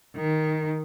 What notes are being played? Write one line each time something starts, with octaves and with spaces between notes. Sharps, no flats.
D#3